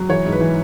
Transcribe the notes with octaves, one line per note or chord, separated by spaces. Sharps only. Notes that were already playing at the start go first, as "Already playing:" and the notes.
Already playing: F#3
E3 C#5
G#2
B4
E3